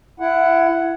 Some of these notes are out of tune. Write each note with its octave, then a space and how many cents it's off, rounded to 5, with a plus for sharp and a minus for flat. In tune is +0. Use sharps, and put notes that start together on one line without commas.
E4 +25 F#5 +0